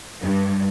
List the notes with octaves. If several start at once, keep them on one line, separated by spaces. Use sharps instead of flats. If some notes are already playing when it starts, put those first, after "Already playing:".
G2